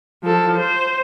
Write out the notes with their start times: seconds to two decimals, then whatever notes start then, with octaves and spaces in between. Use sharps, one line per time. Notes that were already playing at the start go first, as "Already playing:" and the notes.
0.23 F3 A4
0.56 C5